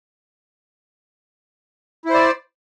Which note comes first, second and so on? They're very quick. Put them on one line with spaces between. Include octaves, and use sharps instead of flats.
E4 C5 D5